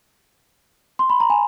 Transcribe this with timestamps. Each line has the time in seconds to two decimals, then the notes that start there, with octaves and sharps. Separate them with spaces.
0.99 C6
1.10 B5
1.20 A#5
1.30 G#5